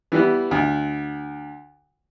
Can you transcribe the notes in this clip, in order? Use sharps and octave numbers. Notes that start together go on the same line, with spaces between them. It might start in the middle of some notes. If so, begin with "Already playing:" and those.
E3 G3 B3
D2